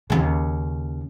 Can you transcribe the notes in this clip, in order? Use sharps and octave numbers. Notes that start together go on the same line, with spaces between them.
D#2 C#3